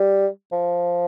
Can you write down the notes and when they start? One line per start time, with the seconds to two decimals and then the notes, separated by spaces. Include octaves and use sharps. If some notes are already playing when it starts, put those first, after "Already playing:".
Already playing: G3
0.52 F3